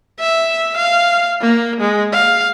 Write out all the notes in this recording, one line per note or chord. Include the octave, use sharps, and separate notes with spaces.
E5
F5
A#3
G#3
F5